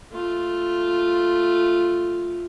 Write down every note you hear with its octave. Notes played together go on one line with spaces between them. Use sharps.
A3 F4